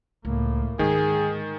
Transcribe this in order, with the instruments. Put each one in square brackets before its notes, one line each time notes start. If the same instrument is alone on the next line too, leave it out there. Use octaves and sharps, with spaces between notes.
[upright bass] C#2 [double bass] A2 A#3
[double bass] G#2 [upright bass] D3 G#3 [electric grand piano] D#3 [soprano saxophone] G#4